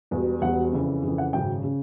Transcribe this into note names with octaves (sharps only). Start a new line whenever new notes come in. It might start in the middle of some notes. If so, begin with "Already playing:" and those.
E1 E2 B2 G3
E1 E2 B2 G3 F#5
F2 C#3 E3
F2 C#3 E3
F#5
G#1 F#2 C#3 G5
C#3